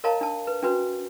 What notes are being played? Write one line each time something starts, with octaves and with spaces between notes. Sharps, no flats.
A#4 C#5 D#5 F5 A5 A#5
D4 A5
B4
C#4 D4 F#4 B4 C5